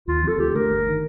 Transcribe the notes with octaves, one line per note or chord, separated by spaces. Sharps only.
D#2 F4
D3 F3 C4 A4
D2 G4
D3 A3 D4 A#4
G1
D#3